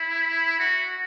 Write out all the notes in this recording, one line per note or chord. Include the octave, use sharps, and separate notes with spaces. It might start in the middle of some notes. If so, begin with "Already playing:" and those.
Already playing: E4
F#4